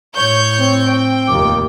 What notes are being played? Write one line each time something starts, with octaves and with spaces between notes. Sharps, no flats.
A2 C#5 G6
C4
G5
F1 D#2 D6